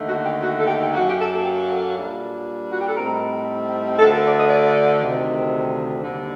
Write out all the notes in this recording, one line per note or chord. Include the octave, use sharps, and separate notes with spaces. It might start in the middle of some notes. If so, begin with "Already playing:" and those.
Already playing: D#2 D3 A3 D#4
F#4
G4
F#4
A4
G4
G4
F#2 F#3 A#3 F#4
G4
A4
A4
G4
A4
A#2 G3 D4
F#4
G4
A4
A2 G3 C4 D#4 A#4
D2 D3 A3 A4
A#4
D5
D#5
D5
D2 C3 D#3
D#2 D3 G3